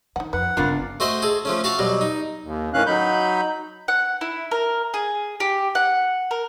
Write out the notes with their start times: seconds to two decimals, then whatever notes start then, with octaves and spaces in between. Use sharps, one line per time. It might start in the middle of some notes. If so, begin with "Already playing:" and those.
0.16 D#3 D#4 F#5
0.33 F2 B4 F#5
0.57 G1 C#3 C4 D4 F4 A#4
1.00 A3 F#4 C5 D#5 E5
1.22 G#4 A4
1.45 F3 A3 C#4
1.64 F#4 E5 F5 A5 C#6
1.79 B2 F#3 G3
2.01 D#4
2.43 D#2
2.74 A2 D#3 E3 C#4 F5 F#6
2.86 F#3 D#4 B5 G6
3.88 F#5
4.21 E4
4.51 A#4
4.94 G#4
5.40 G4
5.75 F#5
6.31 A#4